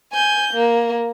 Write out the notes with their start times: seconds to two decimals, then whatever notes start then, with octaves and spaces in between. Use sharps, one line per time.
0.13 G#5 G6
0.54 A#3